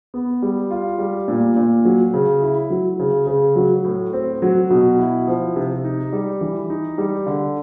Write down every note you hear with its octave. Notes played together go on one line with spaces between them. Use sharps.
B3
G3
F4
G3
A#2
A#2
F#3
C#3
E4
F#3
C#3
C#3
F#3
A2
C4
F#3
B2
E4
F3
C3
D#4
G3
E3
D#4
G3
D3